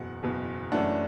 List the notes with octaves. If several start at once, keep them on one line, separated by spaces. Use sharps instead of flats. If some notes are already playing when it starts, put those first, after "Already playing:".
Already playing: F#1 E2 B2 F#5
F#1 E2 B2
F#1 F#2 E3 A3 D4 F#5